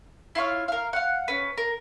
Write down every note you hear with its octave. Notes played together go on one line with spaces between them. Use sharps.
E4 F4 C#5 F5
A#4 F5
F5 F#5
C#4 B4
A#4